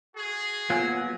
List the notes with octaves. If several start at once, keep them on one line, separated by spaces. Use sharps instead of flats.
F#4 G#4
F#3 A#3 B3 F4 G#5